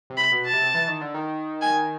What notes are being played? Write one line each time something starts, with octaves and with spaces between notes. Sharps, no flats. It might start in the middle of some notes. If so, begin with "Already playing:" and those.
C3
B5
B2
A5
C3
E3
D#3
D3
D#3
G#5